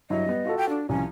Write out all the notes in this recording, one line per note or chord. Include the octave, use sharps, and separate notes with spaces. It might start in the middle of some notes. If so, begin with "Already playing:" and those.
G2 F#3 E4 D#5
G3 B3
F4 F#4 A4
G5
D4
C2 F3 C#4